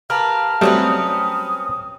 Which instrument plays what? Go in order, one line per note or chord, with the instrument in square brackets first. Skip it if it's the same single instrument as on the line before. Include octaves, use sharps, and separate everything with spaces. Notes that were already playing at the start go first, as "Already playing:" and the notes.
[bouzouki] G4 A#4 B4 [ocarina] F5 [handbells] A5 A#5 F6
[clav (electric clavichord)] F#3 G3 A3 [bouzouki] C4 C#4 B4 [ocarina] D#6